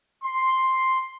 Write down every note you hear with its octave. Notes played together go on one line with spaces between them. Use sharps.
C6